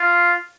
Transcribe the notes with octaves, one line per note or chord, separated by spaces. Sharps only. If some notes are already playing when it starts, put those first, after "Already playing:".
Already playing: F4